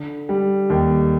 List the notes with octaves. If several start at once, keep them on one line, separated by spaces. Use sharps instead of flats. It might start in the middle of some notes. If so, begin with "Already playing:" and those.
Already playing: D3
G3
D#2